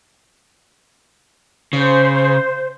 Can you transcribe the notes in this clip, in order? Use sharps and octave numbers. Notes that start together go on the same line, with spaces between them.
C#3 C5